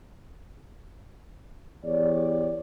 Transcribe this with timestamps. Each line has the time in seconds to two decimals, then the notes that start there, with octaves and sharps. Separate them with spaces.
1.84 E2 G4 C#5 D5